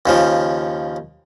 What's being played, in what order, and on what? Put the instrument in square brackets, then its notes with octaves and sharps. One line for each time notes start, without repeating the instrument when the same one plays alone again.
[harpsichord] D#2 C#3 F3